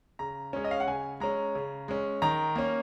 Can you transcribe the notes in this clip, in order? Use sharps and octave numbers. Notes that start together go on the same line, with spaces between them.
C#3 A#5
G#3 C#4 C#5
D#5
F5
F#5
C#3 G#5
G#3 C#4 A#5
C#3
G#3 C#4
D#3 A#5
A#3 C#4